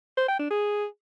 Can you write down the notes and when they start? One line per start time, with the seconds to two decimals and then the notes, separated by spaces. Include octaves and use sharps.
0.17 C5
0.28 G5
0.40 D4
0.51 G#4